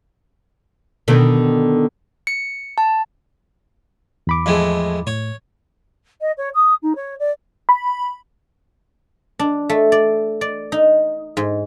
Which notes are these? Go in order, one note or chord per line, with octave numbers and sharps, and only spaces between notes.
B2 D3 D#3
C#7
A5
E2 B5 D6
F2 A2 G#3
A2 C#5
D#5
C#5
D#6
D#4
C#5
D5
B5
D4
A3
D5
D5
D#4
G#2